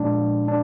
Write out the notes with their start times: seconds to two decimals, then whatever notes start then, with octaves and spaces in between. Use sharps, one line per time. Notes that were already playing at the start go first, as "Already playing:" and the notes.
Already playing: A#2 F3 G#3 D4
0.48 D4